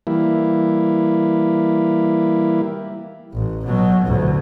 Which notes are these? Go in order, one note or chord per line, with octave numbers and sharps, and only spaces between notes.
E3 G3 A#3 E4
A1
B2 F#3
A1 D2